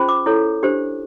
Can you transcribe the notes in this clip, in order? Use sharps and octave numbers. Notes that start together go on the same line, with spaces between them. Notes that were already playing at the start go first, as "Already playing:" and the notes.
Already playing: C#4 F4 G#4 C5
D6
E4 A4 C#5
D4 G4 C5